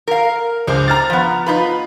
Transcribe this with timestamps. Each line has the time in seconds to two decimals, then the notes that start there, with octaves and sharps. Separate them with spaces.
0.08 A#4 F5
0.67 C#2 D4 G#4 C5
0.88 A#5 F6 A6
1.10 F3 B3
1.46 D#4 F4 B4 B5